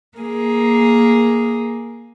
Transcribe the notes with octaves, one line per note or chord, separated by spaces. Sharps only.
A#3 G#4